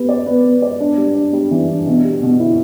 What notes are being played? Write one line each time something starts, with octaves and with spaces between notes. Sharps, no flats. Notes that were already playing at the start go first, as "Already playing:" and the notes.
Already playing: B3 G4
D5
B3
B3
D5
D4
G3
D4
G3
E3
D4
B2
G4
B2
E4